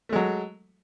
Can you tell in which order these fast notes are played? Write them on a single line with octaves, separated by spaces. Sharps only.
A3 G#3 F#3